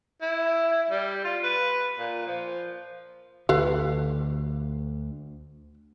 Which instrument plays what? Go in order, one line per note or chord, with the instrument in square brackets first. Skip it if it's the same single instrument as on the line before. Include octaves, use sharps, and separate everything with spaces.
[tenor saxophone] E4
G3
F4
B4
A#2
F3
[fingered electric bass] D2 D3 [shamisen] A4 B4 F5